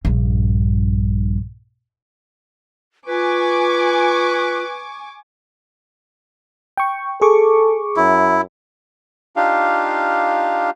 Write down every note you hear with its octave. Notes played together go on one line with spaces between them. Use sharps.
A#1 G2
F4 B4 G#5 C#6 D6
G5 C#6
G#4 A4 C#6 D6
F#2 E4
D4 D#4 F4 G4 F5